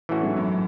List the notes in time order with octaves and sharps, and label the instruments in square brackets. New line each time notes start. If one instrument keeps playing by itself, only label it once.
[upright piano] A2 [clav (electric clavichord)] E3 A3 C#4 F#4
[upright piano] G#2
F#2